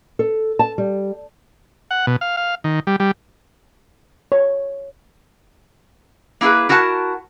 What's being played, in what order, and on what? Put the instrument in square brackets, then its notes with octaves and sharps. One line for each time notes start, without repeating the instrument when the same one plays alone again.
[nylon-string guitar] A4
A5
G3
[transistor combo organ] F#5
B2
F5
F5
D#3
G3
G3
[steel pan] C#5
[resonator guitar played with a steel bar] A#3 E4 G4 G#4 B4
E4 F#4 A#4 F#5 A5